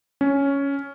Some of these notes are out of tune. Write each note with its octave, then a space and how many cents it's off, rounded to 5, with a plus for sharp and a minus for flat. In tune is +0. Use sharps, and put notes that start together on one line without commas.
C#4 +5